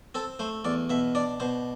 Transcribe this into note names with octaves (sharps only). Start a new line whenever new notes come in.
C4 A4
A3 C5
E2 D5
B2 E5
D4 D5
B2 C5